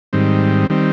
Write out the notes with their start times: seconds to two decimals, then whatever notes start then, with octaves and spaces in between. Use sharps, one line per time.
0.13 G#2 D#3 G3 C4
0.70 D#3 G3 C4